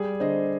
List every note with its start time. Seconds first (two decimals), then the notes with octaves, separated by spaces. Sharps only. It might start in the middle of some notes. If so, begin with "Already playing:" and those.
Already playing: G3 G#4
0.20 D3 C5 D#5